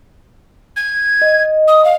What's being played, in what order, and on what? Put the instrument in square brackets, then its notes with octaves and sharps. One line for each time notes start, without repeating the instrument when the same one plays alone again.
[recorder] G#6
[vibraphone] D#5
[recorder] D#6
F5